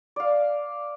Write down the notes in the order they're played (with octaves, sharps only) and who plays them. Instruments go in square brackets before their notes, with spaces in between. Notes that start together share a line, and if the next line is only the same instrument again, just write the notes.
[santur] D5 F5